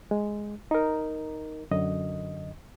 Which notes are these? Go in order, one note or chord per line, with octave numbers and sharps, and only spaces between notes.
G#3
D#4 A#4
F#2 D3 D#5